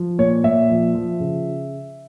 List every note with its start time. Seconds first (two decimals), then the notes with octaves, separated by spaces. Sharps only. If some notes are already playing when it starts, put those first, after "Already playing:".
Already playing: F3
0.19 A#2 C#5
0.44 A#2 E5
0.69 F3
0.95 F3
1.20 C#3